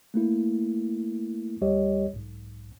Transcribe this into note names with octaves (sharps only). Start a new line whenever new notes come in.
A3 A#3 E4
D2 G3 G4 C#5 D#5
B1 G#2